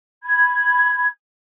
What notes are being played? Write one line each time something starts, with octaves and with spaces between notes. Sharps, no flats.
B5 G#6